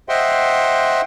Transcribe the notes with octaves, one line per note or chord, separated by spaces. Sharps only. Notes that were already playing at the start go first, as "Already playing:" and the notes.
C5 D#5 E5 F#5 G5 C6